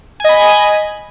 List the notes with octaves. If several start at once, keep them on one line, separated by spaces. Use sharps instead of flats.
D#5 G#5 B5